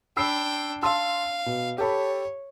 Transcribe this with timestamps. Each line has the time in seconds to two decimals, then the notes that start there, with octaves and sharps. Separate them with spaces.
0.17 D4 G5 B5 E6 C7
0.83 F5 A5 C6 E6
1.46 B2
1.78 G4 A4 C#5 B5